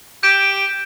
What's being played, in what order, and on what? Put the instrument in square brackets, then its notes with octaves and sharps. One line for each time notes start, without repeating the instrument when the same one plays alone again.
[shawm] G4 [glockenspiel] G6 D7 E7